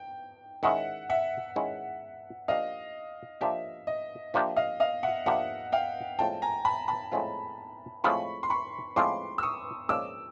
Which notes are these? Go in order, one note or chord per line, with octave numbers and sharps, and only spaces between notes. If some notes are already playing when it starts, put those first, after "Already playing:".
Already playing: G5
D#3 G#3 C#4 E4 E5 F#5
E5 F#5
D#3 G#3 C#4 E4
F3 A#3 D4 G4 D#5 F5
F3 A#3 D4 G4 E5
D#5
F3 A#3 D4 G4 E5
D#5 F5
D#5 F5
E5 F#5
F3 A#3 D4 G4 E5 F#5
F5 G5
A2 F3 G#3 C4 F4 G5 A5
G#5 A#5
A5 B5
A5 B5
A2 F3 G#3 C4 F4
A2 F3 G#3 C4 F4 B5 C#6
C6
B5 C#6
A2 F3 G#3 C4 F4 C6 D6
E6
C#6 D#6
A#2 F3 G#3 C#4 D6 E6